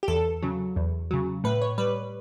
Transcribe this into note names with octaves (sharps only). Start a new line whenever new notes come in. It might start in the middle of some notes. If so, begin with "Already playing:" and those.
G4
E2 A4
C#3 F#3
E2
C#3 F#3
A2 B4
C#5
G3 B4